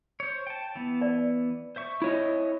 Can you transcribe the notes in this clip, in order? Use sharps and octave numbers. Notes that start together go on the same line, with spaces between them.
C5 C#5
G5 A5
E3 B3
D5
C5 E5 C#6
E4 C#5 D#5